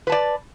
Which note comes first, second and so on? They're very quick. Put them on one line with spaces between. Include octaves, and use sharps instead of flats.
B4 A5 D5